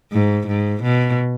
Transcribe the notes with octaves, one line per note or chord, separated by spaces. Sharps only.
G#2
G#2
B2